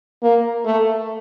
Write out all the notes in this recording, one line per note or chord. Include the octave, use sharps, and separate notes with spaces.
A#3
A3